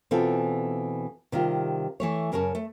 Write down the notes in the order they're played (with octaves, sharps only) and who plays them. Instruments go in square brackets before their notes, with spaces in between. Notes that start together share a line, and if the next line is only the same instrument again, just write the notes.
[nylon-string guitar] B2 E3 C4 F4 A4
C3 D#3 G3 F4
E3 A3 C#5
F#2 C#3 A#4 C#5 A5
A3